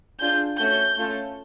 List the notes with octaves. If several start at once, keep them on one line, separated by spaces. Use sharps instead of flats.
D4 F4 G#4 G6
A3 C#4 F#4 A4 G6
A3 C#4 F4 A4